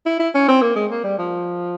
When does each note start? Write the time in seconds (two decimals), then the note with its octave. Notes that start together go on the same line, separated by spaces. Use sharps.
0.06 E4
0.19 E4
0.34 C#4
0.48 C4
0.61 A#3
0.76 G#3
0.91 A#3
1.04 G3
1.18 F3